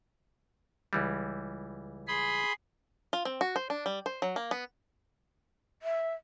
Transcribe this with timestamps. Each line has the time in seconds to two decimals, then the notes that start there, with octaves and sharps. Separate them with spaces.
0.93 C#2 E3 G3
2.08 G#4 B5 C6
3.13 F4
3.25 C4
3.41 F#4
3.56 C5
3.70 D4
3.86 G3
4.06 C5
4.22 F#3
4.36 A#3
4.51 B3
5.82 E5